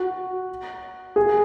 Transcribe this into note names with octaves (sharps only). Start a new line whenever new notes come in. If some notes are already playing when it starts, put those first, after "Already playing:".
Already playing: F#4
G#4